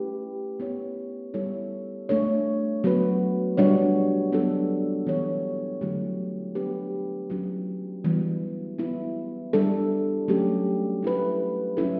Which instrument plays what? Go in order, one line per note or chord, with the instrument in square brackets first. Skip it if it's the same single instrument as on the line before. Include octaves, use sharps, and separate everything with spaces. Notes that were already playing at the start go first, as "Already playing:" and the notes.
Already playing: [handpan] A3 C#4 E4 G4 B4
B3 E4 G4 C#5
G3 B3 E4 A4 C#5
A3 D4 A4 C#5
F#3 B3 F#4 B4
B2 G3 D4 F#4 C#5
F#3 B3 D4 A4
E3 B3 D4 G4 C#5
D3 F#3 A3 E4 G4
B3 D4 G4 B4
F#3 C#4 E4 G4
E3 G3 B3 F#4
B3 E4 B4
G3 D4 A4
F#3 A3 C#4 G4
A3 E4 B4
F#3 C#4 E4 A4